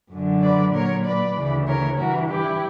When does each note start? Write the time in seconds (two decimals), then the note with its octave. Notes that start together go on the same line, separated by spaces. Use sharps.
0.13 F#2 D3 F#3
0.43 B4 D5
0.73 A#2 F#3 A#4 C#5
1.04 B4 D5
1.36 D2 C#3 E3
1.67 A#4 C#5
1.97 G2 E3 F#4 A#4
2.28 E4 G4